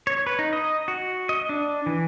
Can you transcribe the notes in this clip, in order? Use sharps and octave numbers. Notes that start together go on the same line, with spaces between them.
C#5
B4
D#4
D#5
F#4
D#5
D4
E3